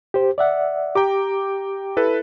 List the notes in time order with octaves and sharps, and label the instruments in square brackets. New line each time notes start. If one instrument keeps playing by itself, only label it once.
[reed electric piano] G4 C5
D5 E5 F#5
[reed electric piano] G4 [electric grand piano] G5 A#5 D6
[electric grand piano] E4 A4 B4